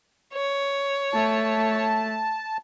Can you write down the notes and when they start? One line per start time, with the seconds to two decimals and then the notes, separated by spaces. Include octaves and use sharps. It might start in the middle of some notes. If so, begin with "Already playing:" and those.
0.35 C#5
1.13 A3 A5